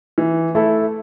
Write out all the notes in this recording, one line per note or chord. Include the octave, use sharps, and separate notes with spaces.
E3
A3 E4 A4